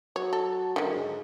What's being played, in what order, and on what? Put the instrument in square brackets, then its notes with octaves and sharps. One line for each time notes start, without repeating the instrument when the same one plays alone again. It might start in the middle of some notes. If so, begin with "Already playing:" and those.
[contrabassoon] F#3 [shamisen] C#5
[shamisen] A4
[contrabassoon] F#2 [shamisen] D3 D#3
[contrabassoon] G#2